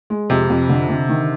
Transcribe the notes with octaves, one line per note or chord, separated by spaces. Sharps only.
G#3
F2 C3
F2
D3
D3
D#3